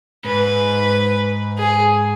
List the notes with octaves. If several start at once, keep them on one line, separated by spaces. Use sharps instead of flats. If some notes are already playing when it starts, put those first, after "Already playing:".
G#2 B4
G#4